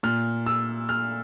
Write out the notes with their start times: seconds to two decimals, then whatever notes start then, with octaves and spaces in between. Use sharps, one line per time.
0.03 A#2 F6
0.46 E6
0.89 F6